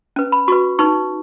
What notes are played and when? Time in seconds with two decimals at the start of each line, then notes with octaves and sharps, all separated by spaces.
0.16 C#4 B4
0.32 B5
0.48 F#4 B4 C#6
0.79 D#4 B4 C#6